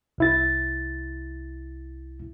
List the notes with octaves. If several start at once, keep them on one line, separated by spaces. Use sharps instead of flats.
C2 E4 A6